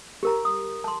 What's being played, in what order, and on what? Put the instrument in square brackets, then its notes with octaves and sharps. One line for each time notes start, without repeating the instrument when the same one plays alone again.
[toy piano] G4 A#4 A#5
D#6
A5 C6